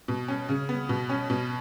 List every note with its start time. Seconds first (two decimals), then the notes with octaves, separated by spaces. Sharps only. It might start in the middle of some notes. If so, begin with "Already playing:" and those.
0.08 B2
0.28 C#4
0.49 C#3
0.69 B3
0.89 B2
1.09 C#4
1.30 B2